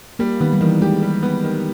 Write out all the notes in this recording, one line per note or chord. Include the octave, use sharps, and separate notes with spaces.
G3 A#3
D#3 B3
G3
D#3 E3
G#3 G4
G3
B3
D#3